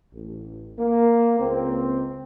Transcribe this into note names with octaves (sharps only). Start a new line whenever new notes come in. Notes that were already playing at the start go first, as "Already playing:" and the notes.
A1
A#3
C#2 C4